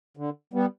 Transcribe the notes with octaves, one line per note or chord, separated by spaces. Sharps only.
D3
G3 B3